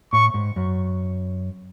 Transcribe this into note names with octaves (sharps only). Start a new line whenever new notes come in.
A2 C#6
G#2
F#2